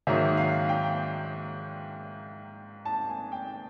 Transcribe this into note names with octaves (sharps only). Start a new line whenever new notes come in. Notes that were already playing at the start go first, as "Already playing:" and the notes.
G#2 D#3 F#3 A#3 E5
F5
G5
A5
G#5
G5